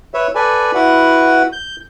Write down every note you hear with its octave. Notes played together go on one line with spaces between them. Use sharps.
B4 C#5 E5
A4 B4 D5 G#5
E4 F#4 B4 F#5
G6